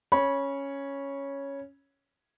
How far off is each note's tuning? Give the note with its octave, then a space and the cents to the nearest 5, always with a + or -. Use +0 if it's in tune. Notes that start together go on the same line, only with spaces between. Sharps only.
C#4 +0 C#5 +0 B5 -25